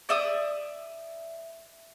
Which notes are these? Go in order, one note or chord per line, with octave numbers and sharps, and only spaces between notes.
D5 E5 D#6